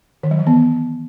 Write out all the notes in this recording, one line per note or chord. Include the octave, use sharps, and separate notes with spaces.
D#3
F#3
E3
B3